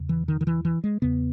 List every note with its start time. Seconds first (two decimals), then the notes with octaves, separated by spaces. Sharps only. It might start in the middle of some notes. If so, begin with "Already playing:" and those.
Already playing: E2 C#3
0.09 E3
0.28 D#3
0.41 D#3
0.47 E3
0.65 E3
0.84 G#3
1.02 E2 C#3 B3